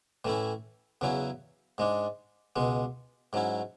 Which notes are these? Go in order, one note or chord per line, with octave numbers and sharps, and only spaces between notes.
A2 E3 A3 C#4 E4
E2 C#3 F#3 C#4 E4
G#2 G#3 D4
C#2 B2 G#3
G#2 F#3 C#4 E4